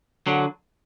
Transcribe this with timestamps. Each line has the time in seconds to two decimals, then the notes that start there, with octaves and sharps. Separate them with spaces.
0.27 D3 F#3